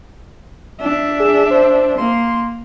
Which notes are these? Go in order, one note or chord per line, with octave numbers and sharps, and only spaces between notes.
D4 E5
G#4
C5
A#3 C6